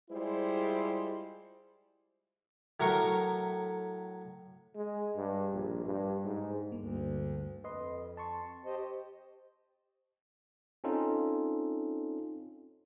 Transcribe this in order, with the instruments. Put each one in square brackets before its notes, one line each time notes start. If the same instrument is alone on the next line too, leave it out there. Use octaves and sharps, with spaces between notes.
[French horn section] G3 G#3 E4 F4 C5
[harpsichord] A2 F#3 A#4 C#6
[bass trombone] G#3
G2
A#1
G2
G#2
[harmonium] D2 [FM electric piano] G2 A#3
[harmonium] F2 [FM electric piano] B4 D#5 C6
[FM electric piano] A5 C6 C#6
[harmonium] G4 C5 D#5
[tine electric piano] C4 C#4 D#4 F4 A4